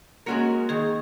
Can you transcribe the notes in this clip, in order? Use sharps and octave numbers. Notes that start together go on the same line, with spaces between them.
G#3 A#3 C#4 F#4 A#4
D#3 G#4